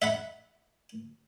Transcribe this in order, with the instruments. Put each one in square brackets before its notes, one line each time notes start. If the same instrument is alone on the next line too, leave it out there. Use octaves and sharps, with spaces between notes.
[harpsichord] E5 F#5 B5